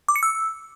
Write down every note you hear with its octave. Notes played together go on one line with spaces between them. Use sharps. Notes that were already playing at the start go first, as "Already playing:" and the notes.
D6
C#7
E6